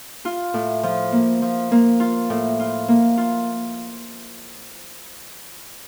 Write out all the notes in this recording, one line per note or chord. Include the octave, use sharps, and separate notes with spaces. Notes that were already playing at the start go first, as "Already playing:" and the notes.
F4
A2
F3
A#3
F3
A#3
F4
A2
F4
A#3
F4